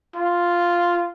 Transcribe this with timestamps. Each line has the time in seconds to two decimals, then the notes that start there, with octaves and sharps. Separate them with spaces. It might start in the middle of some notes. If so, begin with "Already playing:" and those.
0.16 F4